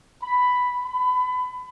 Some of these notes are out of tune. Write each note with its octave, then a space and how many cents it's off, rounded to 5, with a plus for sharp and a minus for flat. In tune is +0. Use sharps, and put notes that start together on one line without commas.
B5 +5
B5 +25